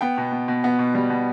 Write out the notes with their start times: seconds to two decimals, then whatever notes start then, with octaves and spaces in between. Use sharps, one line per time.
0.01 B3 G5
0.17 B2
0.32 B2
0.48 B2
0.64 B3
0.79 B2
0.95 G3
1.10 B2